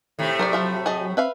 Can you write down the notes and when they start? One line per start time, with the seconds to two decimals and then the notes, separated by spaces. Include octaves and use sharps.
0.19 A2 C3 D#3 A3
0.39 F#3 A#4 C#5 D5
0.53 F3 F4 E5
0.86 G#4 D#5 A5
1.17 C4 B4 E5 F5